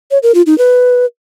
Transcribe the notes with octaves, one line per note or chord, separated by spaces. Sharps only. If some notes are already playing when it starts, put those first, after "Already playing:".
C#5
A#4
F4
D#4
B4